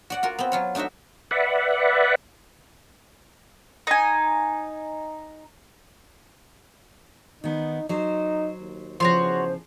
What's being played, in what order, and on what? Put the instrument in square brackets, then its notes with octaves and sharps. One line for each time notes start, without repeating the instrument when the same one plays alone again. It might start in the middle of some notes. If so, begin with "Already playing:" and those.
[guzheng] F#4 D5 F#5
F4 F#4 A#4
B3 C4
F#3 F4 C#5
A3 D4 D#4 F#4 E5
[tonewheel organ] B4 D5 E5 F#5
[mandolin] D#4 G#5
[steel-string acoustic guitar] D#3 B3 [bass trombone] D#4
[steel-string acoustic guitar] F#3 C5 [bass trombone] D#4
[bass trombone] D#2
[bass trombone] E2 [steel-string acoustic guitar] C#3 F3 [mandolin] F#4 C#5 C6 [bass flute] C5